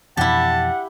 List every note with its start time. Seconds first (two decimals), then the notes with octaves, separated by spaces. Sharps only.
0.17 F2 B2 E3 E4 G4 F#5 A5